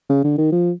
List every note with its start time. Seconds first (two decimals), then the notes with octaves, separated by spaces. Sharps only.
0.09 C#3
0.24 D3
0.38 D#3
0.52 F3